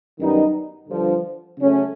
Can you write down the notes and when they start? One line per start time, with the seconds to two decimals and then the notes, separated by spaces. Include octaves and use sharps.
0.18 F#2 D#3 G3 B3 D#4
0.88 G2 D3 F3
1.59 C#3 F#3 A3 C#4